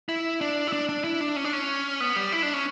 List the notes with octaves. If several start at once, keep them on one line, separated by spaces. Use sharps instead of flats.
E4
D4
E4
D4
D4
E4
D4
C#4
D4
C#4
B3
G3
E4
D4
C#4